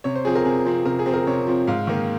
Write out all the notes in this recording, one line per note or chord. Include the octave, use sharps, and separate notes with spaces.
C3 C#5
C5
F3 C4 G#4
A#4
C3 G#4
F3 C4
C3 A#4
G#4
F3 C4
A#4
C3 C#5
F3 C4
G#2 F5
D#3 A#3